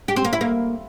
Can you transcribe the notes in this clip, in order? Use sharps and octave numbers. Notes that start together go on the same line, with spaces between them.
G4
C4
A#3
E4
A#3